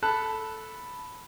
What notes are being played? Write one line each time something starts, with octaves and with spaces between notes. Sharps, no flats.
A4 A5 B5 F#6